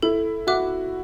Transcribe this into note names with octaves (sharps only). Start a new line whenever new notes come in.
E4 A4
F#4 E5 D6 F#6